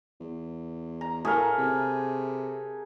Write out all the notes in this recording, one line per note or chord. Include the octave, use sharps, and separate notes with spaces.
E2
A#5
A2 A3 G#4 A#4
C3